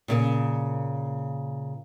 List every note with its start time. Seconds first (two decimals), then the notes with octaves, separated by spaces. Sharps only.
0.08 A#2 C#3 A#3